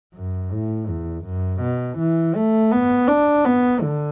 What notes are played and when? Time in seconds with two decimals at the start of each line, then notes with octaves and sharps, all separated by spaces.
0.15 F#2
0.52 A2
0.88 E2
1.25 F#2
1.61 B2
1.98 E3
2.35 A3
2.72 B3
3.08 D4
3.45 B3
3.82 D3